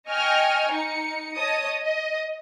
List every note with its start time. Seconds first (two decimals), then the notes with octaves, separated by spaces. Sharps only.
0.10 D#5 G5 G#5 C#6 F6
0.71 D#4 C#7
1.36 C#5 D#5 A5 D#6
1.82 D#5